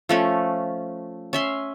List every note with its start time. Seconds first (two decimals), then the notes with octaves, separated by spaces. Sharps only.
0.09 F3 A3 C#4
1.33 C#4 E5 C6